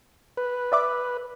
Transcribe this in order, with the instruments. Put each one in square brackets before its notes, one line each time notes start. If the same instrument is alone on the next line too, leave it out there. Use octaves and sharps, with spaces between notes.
[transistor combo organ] B4
[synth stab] D5 E5 D6